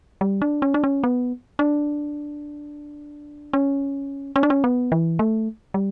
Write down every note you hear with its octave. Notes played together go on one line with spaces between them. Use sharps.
G3
D4
C#4
D4
C#4
B3
D4
C#4
C#4
D4
C#4
B3
E3
A3
G3